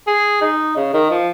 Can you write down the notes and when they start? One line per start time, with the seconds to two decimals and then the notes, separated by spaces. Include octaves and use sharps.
0.07 G#4
0.41 D#4
0.76 C#3
0.94 D#3
1.11 F3